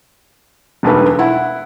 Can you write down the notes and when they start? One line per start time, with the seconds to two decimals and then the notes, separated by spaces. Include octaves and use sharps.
0.83 E1 B1 A4 B4
1.19 E4 F#5